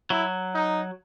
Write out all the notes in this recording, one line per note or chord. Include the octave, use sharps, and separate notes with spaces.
F#3 E4
D#4